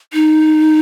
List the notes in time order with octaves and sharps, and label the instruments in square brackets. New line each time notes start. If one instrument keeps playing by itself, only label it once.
[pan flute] D#4